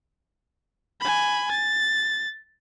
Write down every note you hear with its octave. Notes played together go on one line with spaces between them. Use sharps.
G#5 B5
A6